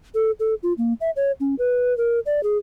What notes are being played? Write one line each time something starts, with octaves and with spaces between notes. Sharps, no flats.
A4
A4
F4
A#3
E5
C#5
C#4
B4
A#4
D5
G#4